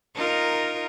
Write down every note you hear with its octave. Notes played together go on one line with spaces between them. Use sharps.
D#4 F4 A#4